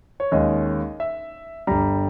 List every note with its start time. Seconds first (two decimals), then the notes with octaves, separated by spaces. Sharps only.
0.20 C#5
0.32 D#2 D#3 G#3 C#4 D#5
1.00 E5
1.67 G1 G2 G3 A#5